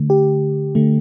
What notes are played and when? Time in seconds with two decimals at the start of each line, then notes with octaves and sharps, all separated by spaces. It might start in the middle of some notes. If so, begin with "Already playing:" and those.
Already playing: D3 A3
0.10 G4
0.75 D3 A3